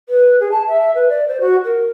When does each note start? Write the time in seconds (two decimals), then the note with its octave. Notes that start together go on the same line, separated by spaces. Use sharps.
0.09 B4
0.40 G#4
0.52 A5
0.68 E5
0.95 B4
1.09 D5
1.28 C5
1.41 F#4
1.65 A#4